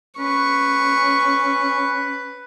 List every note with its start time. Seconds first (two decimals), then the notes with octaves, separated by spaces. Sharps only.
0.19 C#4 B4 C#6